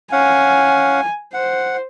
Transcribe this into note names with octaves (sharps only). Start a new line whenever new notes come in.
C#4 F5 F#5 G#5
C5 F#5